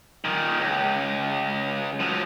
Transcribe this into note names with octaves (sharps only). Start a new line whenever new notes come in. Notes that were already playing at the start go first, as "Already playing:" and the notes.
A#2 D#3
C#2
F3 F#3